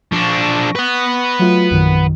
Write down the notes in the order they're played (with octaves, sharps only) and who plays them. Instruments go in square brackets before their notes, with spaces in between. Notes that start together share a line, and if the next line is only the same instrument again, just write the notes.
[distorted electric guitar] F3 D4 [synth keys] C#6 A#6
[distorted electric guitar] B4 F#5
[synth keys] F#3 A3 F4
A#1 F#2 D#3